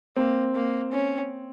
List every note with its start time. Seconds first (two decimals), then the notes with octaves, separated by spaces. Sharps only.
0.16 A#3 C4
0.55 A#3
0.92 C#4